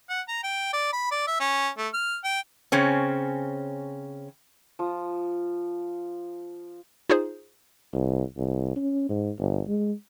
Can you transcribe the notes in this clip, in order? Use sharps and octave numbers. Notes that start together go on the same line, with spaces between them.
F#5
A#5
G5
D5
B5
D5
E5
C#4
A3
F6
G5
C#3 C4 C#4
F3 D#6
D#4 F4 G#4 C5
C2
C2
C#4
G#2
G1
G#3